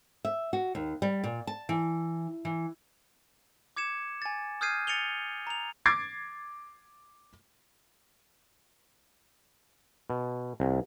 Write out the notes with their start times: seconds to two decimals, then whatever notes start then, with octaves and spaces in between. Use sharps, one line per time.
0.25 E5
0.53 F#4
0.75 D#2
1.02 G3
1.24 A#2
1.47 A5
1.69 E3
2.45 E3
3.76 D6 G#6 C#7 E7
4.22 G#5 A6
4.61 D#6 F6 G6 G#6 C7 D#7
4.87 A6 C#7 D#7 F7 G7
5.47 A#5 F7
5.86 D6 G#6 A6 C7 D7
10.10 B2
10.60 C2